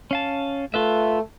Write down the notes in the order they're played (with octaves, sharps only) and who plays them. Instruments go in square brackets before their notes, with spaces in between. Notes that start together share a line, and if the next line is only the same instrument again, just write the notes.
[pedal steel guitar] C#4 F5 A5
[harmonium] A3 [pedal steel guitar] F4 B4 E5